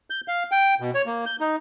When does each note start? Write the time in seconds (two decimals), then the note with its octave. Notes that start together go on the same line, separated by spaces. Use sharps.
0.10 G6
0.28 F5
0.52 G5
0.80 B2
0.95 C#5
1.06 A#3
1.26 G6
1.40 D#4